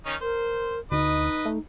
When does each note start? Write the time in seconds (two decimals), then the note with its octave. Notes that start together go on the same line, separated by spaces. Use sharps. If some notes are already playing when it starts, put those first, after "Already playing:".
0.06 D#3 C#4 D#4
0.21 A#4 C5
0.92 D2 D#4 B4 D#5
1.45 A3